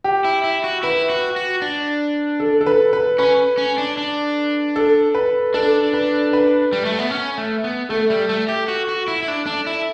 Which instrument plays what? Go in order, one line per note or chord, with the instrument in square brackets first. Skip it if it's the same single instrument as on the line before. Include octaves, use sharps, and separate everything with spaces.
[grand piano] G4
[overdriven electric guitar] E4
E4
F#4
[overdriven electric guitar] E4 [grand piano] B4
[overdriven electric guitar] F#4
F#4
D4
[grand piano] A4
A4
B4
B4
[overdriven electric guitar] C#4 [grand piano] B4
[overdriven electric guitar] C#4
D4
D4
[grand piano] A4
B4
[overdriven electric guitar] D4 [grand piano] A4
[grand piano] B4
B4
[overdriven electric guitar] G3
A3
B3
C#4
A3
B3
[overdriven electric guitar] A3 [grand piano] A4
[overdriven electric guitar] G3
A3
G4
F#4
F#4
E4
E4
D4
D4
E4